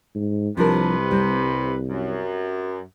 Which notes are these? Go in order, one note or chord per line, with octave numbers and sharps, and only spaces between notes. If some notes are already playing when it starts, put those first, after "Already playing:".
G#2
C2 C3 F3 D4 A#4 B4
G3 C4
F#2